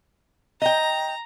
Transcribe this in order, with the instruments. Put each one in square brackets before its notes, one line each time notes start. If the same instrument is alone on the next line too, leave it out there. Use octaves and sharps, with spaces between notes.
[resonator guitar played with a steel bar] D#5 G5 [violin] A#5